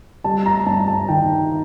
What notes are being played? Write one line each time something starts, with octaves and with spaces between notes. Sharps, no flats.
G3 A5
A#5
G2 A5
A5
D#3 G5